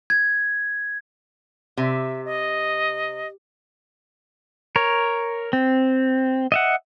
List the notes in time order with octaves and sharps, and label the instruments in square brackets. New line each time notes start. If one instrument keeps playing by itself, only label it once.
[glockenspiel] G#6
[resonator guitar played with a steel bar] C3 [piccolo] E5
[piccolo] D#5
[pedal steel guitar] A#4 C#5
C4
D#5 E5 F#5